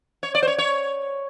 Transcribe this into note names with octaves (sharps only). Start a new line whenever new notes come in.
C#5
D5
C5
C#5
C#5